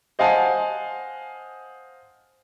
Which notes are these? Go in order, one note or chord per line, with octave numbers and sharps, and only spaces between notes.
C5 D#5 F5 F#5 G#5 A5